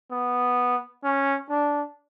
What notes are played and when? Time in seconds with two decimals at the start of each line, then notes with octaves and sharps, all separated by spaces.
0.11 B3
1.04 C#4
1.49 D4